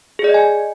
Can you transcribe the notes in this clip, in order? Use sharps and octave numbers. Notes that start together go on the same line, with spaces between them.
G#4
D5
D#5
G#5